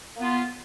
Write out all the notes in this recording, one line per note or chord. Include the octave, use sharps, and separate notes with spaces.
A#3 B3 F4